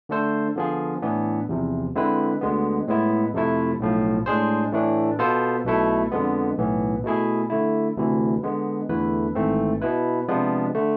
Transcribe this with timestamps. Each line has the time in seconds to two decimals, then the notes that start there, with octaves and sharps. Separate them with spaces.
0.09 D3 A3 D4 A4 C5
0.56 D3 F3 B3 F4 G#4
1.02 A2 E3 B3 D4
1.49 E2 C3 F3
1.95 D3 G#3 C4 E4 B4
2.41 D2 D3 G#3 B3
2.87 A2 G#3 B3 E4
3.34 F2 C3 F3 A3 E4
3.80 B1 A2 F3
4.26 A2 G#3 D4 G#4 C5
4.72 A2 E3 A3 D4
5.19 B2 B3 F4 A4 C5
5.65 B1 B2 A3 E4 A4
6.11 F2 D3 F3 G#3 B3
6.58 B1 A2 E3 B3
7.04 B2 A3 E4 G#4
7.50 D3 A3 E4
7.97 D2 C3 E3 A3 E4
8.43 D3 G#3 B3
8.89 E2 D3 A3 E4 B4
9.35 G#1 G#2 E3 A3 C4
9.82 B2 B3 E4 B4
10.28 C3 F3 G#3 B3 D4
10.74 D3 A3